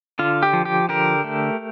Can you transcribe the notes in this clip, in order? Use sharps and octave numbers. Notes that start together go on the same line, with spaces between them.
D3 F4
G4
F3
G4
D3 G4 A#4
A3